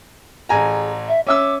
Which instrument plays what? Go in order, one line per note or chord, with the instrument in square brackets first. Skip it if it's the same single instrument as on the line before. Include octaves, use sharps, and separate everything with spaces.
[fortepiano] A1 G#5 A#5 [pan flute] G#4
[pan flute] E5
[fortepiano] C#4 E5 E6 [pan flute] D6